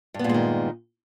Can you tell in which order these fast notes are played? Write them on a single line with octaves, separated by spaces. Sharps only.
G2 B3 A#2 G#3 D#3